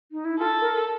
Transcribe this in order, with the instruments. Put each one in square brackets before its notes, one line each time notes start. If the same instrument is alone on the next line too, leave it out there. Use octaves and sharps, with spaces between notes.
[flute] D#4
E4
[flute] F4 [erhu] A4
[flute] A#4